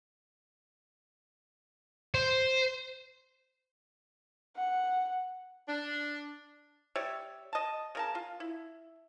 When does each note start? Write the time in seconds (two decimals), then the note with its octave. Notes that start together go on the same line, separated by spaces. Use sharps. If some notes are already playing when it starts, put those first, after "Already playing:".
2.15 C5
4.57 F#5
5.68 D4
6.96 G3 C#5 D5 E5
7.53 D#5 A5
7.95 C#3 A#4 A5
8.15 F4
8.40 E4